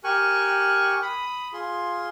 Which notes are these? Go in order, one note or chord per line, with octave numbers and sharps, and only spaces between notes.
G4 A#4 G#5 C#6 F#6
B5 D#6
F4 G#4 C6